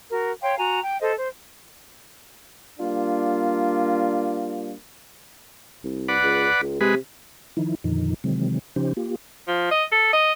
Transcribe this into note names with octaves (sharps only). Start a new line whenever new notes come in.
F#4 A#4
C#5 F5 G5 C6
F#4 G#5 A#5
G5
A4 C5 D#5
C5
G3 A#3 D4 F4
C2
B4 D5 F#5
C#2
C#2
C3 G#3 B4
D#3 F3 D#4 E4
F2 A#2 D3 D#3 F3 D#4
C3 D#3 E3 F#3 G#3 C4
C#3 F3 C#4 D#4 G4 C5
A#3 F4 G4
F3
D#5
A4
D#5